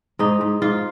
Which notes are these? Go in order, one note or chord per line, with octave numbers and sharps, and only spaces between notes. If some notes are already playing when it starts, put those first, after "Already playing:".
G#2 D#4
G#2
G#2 F4